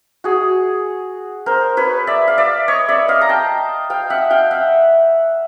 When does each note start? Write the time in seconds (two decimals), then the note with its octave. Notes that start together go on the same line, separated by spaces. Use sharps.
0.24 F#4 G#4
1.46 A#4 C5
1.77 B4 C#5
2.07 D5 E5
2.28 F5
2.38 D5 E5
2.68 C#5 D#5
2.88 D5 E5
3.08 D#5 F5
3.22 A#5
3.29 G5 A5
3.90 F5 G5
4.10 E5 F#5
4.31 F5 G5
4.51 E5 F#5